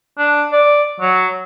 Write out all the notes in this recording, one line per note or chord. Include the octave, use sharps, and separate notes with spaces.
D4
D5
F#3